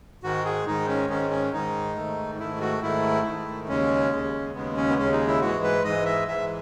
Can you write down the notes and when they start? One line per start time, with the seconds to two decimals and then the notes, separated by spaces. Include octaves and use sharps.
0.23 G#2 D#3 G#3 F#4
0.45 G#4
0.67 G#2 D#3 G#3 D#4
0.88 C#4
1.10 G#2 D#3 G#3 C#4
1.31 C#4
1.53 G#2 D#3 G#3 D#4
1.96 G#2 D#3 A3
2.39 G#2 D#3 A3 E4
2.61 F#4
2.82 G#2 D#3 A3 E4
3.26 G#2 D#3 A3
3.68 D#2 C#3 G#3 C#4
4.12 D#2 C#3 G#3
4.55 D#2 C#3 G#3 B3
4.77 C#4
4.89 B3
4.98 D#2 C#3 G#3 C#4
5.12 D#4
5.27 E4
5.41 G#2 E3 G#3 F#4
5.64 B4
5.84 G#2 E3 G#3 D#5
6.06 E5
6.28 G#2 E3 G#3 E5